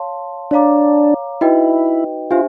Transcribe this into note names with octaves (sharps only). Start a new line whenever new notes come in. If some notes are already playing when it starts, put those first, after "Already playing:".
Already playing: C#5 F5 A5 C6
D4 C#5 F5 A#5 D6
D#4 E4 F#4 B4 D#5 G5
D4 F4 G4 C5 E5 G#5